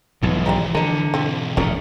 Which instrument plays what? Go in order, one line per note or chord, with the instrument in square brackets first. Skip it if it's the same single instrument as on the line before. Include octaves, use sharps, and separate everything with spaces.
[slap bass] B1 G#2 [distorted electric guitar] E3 F3
[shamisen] G3 C#4 D#4
[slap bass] D3 [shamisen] A#4 D#5
[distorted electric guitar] B1 E3 [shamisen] F3 C4 A4
[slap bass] F1 E2 A2 [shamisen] C#4 D4 A#4